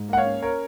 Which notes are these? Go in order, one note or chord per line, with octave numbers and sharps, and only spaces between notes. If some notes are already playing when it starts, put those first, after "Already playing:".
Already playing: G#2
A#3 F#5
C#5 F5
C#4
A#4 C#5